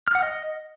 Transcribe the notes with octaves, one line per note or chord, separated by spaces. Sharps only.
F6
F#5
D#5